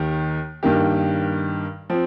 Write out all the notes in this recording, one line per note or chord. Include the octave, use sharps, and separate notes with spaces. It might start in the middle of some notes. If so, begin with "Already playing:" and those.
Already playing: D#2 D#3 G4
G2 D#3 A#3 G4
F3 C4